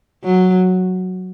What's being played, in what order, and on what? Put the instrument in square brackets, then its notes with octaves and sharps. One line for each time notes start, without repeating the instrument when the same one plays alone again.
[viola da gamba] F#3